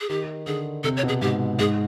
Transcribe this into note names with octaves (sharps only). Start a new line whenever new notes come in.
G#4
D#3 G4
D3 G#4
C3 A4
C#5
B2
G#4
G#2 G4
G#2 G#4